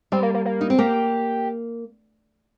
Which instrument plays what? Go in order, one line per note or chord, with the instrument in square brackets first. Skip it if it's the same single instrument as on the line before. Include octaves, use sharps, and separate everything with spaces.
[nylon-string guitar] G3 [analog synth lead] C4
[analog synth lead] A#3
A#3
A#3
[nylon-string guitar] D#4
C4
[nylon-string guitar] A#3 [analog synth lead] G4